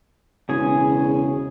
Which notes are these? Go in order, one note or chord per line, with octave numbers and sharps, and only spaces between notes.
E1 C#3 G#4 G#5